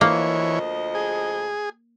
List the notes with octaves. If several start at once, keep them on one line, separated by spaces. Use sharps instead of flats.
D2 E3 F3 A#3 C#5 D#5
G#4